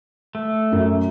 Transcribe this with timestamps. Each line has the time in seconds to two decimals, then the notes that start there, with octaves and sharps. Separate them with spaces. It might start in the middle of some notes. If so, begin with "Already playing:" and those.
0.35 A3
0.72 F#2